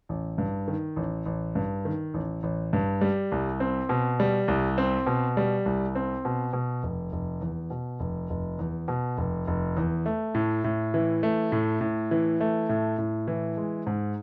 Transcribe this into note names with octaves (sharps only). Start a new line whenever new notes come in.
A1
G2
D#3
A1
A1
G2
D#3
A1
A1
G2
G3
C2
C4
B2
G3
C2
C4
B2
G3
C2
C4
B2
B2
F1
F1
E2
B2
F1
F1
E2
B2
F1
F1
E2
A3
A2
A2
E3
A3
A2
A2
E3
A3
A2
A2
E3
G#3
G#2